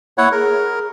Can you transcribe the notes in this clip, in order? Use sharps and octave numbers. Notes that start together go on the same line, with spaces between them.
A#3 E4 C#5 F#5
G#4 A#4